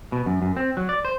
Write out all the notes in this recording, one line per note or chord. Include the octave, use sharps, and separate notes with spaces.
B2
F#2
F#2
C4
F#3
D5
C5